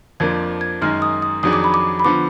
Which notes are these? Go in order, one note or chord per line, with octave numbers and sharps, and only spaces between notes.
F2 F3 A#3 D4 G#6
G#6
F#2 D#3 G#3 D#4 F6
D#6
D#6
F2 D#3 F#3 D4 G#4 D#6
D6
B5
D6
B5
D3 F3 B3 D6